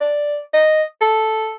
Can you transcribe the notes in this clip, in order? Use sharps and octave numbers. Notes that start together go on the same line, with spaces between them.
D5
D#5
A4